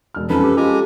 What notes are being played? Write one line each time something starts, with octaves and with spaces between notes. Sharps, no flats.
E1 F6
F2 C#4 D#4 A4 B4
G4
G#3 F4 G4 A4 G#5 A#5